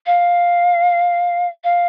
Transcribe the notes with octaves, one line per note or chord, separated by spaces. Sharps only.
F5
F5